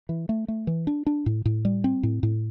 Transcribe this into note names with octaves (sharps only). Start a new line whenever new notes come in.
E3
A3
A3
E3
D4
D4
A2
A2
G3
C4
A2
A2